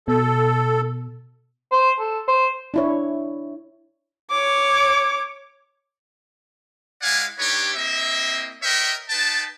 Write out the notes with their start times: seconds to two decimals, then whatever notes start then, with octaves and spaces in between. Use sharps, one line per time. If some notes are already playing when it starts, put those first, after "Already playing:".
0.08 B2 A4
1.72 C5
2.00 A4
2.28 C5
2.74 D4 E4 C#5
4.31 C#5 D6
7.01 G#3 E4 D5 F5 F#5 G#5
7.38 G3 D4 D#4 G4 B4 C#5
7.74 A#3 C4 E4 D#5 E5
8.62 A#4 B4 C#5 D#5 E5 G5
9.09 D#4 B4 G5 A5